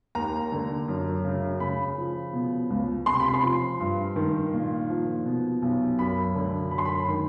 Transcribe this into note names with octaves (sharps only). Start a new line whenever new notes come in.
D#2 A#5
D3
F#2
C#3
C#3 B5
F3
B2
C#2
C3 C6
B5
C6
F3
G2
D#3
A#2
F3
B2
B1
F#2 B5
D3
F#2 B5
C6
B5
D#3